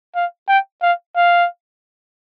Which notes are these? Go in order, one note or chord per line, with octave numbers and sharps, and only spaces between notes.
F5
G5
F5
F5